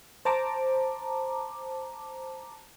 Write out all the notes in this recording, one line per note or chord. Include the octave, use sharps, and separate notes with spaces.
C5 A5 A#5 D6